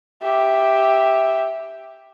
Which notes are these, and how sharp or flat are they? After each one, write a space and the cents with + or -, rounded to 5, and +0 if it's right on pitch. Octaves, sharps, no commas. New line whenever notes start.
G4 +0 E5 -5